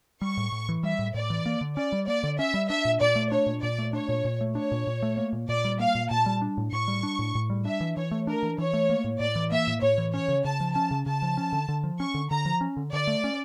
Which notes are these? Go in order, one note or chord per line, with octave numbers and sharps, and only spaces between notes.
G3 C#6
A2
A2
E3
G3 E5
A2
A2 D5
E3
A#3
D3
C#4 D5
G3
A#3 D5
D3
C#4 E5
G3
D4 E5
A#2
A#2 D5
A3
D4 C#5
A#2
A#2 D5
A3
D4 C#5
A#2
A#2
A3
D4 C#5
A#2
A#2
A3
A#3
A#2
A#2 D5
G3
A#3 F5
A#2
A#2 A5
G3
D4
A2
A2 C#6
G3
D4
A2
A2
G3
D4 E5
E3
E3 C#5
A3
D4 A#4
E3
E3 C#5
A3
A#3
A2
A2 D5
E3
A#3 E5
A2
A2 C#5
E3
C#4 C#5
C#3
C#3 A5
F3
C#4 A5
C#3
C#3 A5
F3
C#4
D3
D3
F3
C#4 C#6
D3
D3 A#5
F3
C#4
D3
D3 D5
A3
C#4